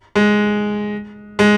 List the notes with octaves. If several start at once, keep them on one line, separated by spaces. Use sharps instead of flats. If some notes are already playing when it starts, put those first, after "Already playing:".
G#3
G#3